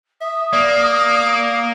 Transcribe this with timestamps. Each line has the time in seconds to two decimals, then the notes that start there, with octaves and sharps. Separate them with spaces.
0.21 E5 D#6
0.53 A#3 D5